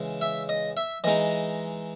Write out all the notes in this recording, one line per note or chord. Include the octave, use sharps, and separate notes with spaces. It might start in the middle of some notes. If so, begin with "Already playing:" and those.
Already playing: C#3 E3 G#3
E5
D#5
E5
E3 G#3 D#4 D#5